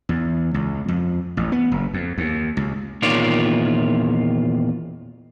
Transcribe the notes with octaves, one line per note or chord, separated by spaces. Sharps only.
E2
C#2
F2
A1
B3
F#1
F2
D#2
C#2
E2 A#2 D#3 F4 C#5 D5